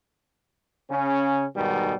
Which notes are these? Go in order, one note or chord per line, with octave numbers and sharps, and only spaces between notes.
C#3 C#4
G#2 B2 D#3 G3